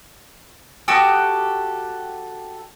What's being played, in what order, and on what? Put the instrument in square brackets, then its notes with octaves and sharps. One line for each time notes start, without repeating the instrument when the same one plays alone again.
[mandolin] F#4 G4 A4 D#6